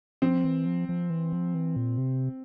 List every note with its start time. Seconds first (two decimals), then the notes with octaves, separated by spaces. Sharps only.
0.22 F3 C4
0.44 E3
0.66 F3
0.89 F3
1.10 E3
1.32 F3
1.55 E3
1.76 A#2
1.98 C3